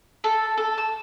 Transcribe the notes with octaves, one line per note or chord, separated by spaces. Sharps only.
A4
A4
E6